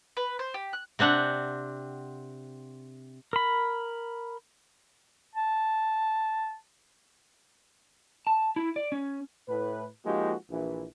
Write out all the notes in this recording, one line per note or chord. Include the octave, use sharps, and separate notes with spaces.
B4
C5
G4
F#6
C3 C4 D4 F#5
A#4 B5
A5
A5
E4
D5
C#4
A2 B4
F3 G#3 A#3 D#4 F#4 G4
A#1 E3